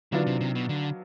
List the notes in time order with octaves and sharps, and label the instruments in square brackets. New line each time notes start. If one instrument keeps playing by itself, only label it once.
[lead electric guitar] D3 [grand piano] D#3 F#3 B3 D4 F4
[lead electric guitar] C3
C3
B2
D3